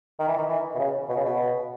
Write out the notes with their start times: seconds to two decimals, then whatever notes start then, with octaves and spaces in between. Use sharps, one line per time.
0.20 D#3
0.28 E3
0.38 D#3
0.49 E3
0.75 B2
0.79 C#3
1.09 B2
1.17 C#3
1.25 B2